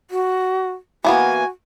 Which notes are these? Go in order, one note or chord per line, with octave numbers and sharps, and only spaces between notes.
F#4
E3 A#3 B3 F#4 G#5